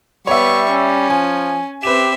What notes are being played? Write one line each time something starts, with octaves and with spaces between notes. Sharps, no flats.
G3 B3 C#5 E5 C#6
C#4
F3 G#5
C4 G4 B4 E5 E7